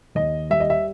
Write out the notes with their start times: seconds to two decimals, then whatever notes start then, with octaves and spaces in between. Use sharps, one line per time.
0.15 D#2 D#5
0.50 G3 E5
0.60 D#5
0.70 E5